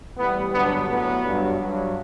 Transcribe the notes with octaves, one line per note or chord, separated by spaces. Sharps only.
A2 E3 G3 B3
G2 D3 F#3 B3
A2 F#3 B3
G2 F#3
G2 F#3